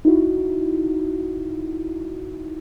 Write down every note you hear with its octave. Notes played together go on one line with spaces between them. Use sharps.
D#4 E4 F#4